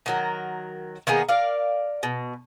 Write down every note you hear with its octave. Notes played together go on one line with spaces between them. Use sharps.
D#3 F#3 A#4
D#3 A#3 B3 G#4
A#4 D5 F5
B2